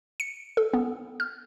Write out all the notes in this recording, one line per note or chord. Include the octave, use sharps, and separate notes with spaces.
C#7
A4
B3
F6